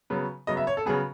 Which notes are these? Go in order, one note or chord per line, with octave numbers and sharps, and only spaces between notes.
C#3 F#3 B3
C#3 F#3 B3 D#5
E5
C#5
A4
C#3 F#3 B3 G#4